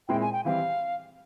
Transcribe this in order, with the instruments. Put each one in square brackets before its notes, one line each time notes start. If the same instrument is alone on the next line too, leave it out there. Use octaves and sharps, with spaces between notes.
[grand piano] A#2 G#3 C4 E4 [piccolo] G5
[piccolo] G#5
G5
[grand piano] E3 G3 C4 G4 [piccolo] F5